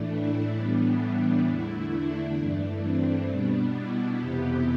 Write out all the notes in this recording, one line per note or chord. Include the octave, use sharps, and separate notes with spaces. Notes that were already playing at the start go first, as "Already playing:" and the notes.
Already playing: A2 E3 A3 D4
E4
A2 E3 G3 B3 D4
D4
E2 D3 A3 E4
D4
G2 E3 A3
C4
B2 G3 B3 D4
E4
F2 C3 E3 B3 G4